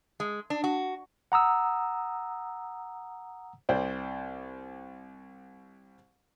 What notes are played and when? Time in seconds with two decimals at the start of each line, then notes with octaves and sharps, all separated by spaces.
0.20 G#3
0.50 D4
0.64 F#4
1.32 F#5 A#5 D#6 E6
3.69 C2 C5 D5 G5